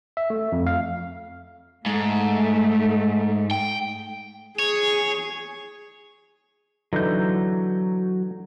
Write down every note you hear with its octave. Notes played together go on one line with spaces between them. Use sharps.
E5
A3
F2
F5
G#2 A3
G5
G#4 C#5
D3 E3 F#3 D#4 G6